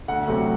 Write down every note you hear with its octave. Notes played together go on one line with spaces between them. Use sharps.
D2 F#5
C3 F#3 A3